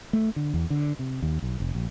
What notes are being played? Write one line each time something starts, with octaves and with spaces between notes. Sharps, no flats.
A3
D3
E2
D3
C3
D#2
B1
F1
A#1